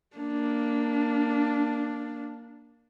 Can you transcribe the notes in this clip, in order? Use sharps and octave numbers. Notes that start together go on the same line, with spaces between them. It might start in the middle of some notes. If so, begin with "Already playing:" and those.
A#3 D4